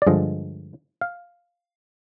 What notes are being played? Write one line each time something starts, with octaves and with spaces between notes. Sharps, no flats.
D5
G2 D3 F3 G#3 D#5
F5